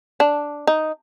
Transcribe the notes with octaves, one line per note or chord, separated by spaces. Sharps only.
D4
D#4